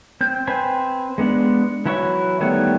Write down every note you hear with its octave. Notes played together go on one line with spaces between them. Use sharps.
C4 G6
C4 B4 C5 G#5
G#3 B3 D4
E3 F#3 E4 C#5 C#6
D#3 G3 A3 B3 C#5